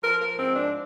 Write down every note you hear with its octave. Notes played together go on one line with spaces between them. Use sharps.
F3 A#4
A#4
G#2 C4
D4